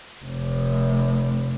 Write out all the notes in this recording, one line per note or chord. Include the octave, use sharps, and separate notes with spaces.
F1 C3